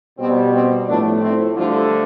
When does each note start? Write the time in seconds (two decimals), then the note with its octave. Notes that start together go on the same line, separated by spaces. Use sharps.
0.18 B2 G3 C4
0.53 C4
0.87 A2 F3 A3 B3 D4
1.21 C4 E4
1.56 G2 D3 F3 A3 D4 F4